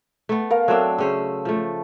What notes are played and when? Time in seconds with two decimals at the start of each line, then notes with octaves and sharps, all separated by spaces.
0.29 A3 B3
0.50 A#4 F5
0.68 F#3 A3 C4 D4 E6
0.98 C#3 C#4 C5 E6
1.45 F3 A3